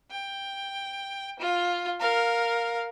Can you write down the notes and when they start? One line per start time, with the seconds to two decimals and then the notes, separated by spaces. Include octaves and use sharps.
0.11 G5
1.40 F4
2.00 A#4 F5